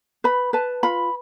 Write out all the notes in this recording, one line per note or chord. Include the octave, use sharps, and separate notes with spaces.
B4 B5
B4 A5
F4 B5